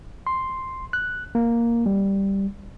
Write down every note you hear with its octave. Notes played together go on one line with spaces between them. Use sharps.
C6
F#6
A#3
G3